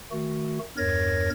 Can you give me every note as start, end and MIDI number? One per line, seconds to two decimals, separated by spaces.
0.11 0.59 51
0.11 0.59 57
0.11 0.59 66
0.77 1.30 40
0.77 1.30 43
0.77 1.30 70
0.77 1.30 73
0.77 1.30 92
0.77 1.30 94